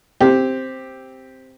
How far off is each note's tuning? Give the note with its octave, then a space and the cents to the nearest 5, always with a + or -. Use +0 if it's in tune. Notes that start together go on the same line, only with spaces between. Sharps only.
C4 +0 G4 +0